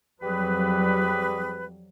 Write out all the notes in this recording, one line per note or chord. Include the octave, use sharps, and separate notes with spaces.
F2 F#3 G3 G4 G#4 B4